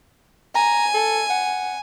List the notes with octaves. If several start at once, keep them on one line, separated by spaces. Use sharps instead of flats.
G#5 A#5
A4
F#5